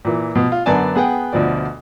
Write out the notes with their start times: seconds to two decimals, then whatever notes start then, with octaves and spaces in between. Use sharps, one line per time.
0.05 A#2 E3
0.35 B2 F3
0.52 F4
0.66 F#2 D3 B3 D5 G#5 A5
0.95 B3 G#4 F#5 G5
1.33 D2 B2 F3 D5